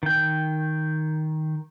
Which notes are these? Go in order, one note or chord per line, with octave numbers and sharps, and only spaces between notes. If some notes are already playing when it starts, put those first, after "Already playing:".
D#3 G5